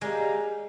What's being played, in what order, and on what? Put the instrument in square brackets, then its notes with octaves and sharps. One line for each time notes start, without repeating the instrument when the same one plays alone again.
[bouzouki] D#3 G3 A#3 D#4 [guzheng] G#3